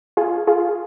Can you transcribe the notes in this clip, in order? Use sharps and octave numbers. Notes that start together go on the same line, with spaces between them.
F4 G#4
F4 G#4